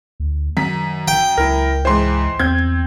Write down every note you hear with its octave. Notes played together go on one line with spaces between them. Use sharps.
D2
F#2 D#3 B6
G5
C#2 E4 A#4
G#2 E3 C5 C6
E2 C4 G6 G#6